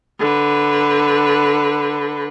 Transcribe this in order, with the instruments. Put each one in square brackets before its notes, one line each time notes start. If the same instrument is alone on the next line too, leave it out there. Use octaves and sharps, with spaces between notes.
[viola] D3 B4